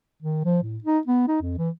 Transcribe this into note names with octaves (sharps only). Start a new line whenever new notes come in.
D#3
F3
A2
D#4
B3
D#4
F2
E3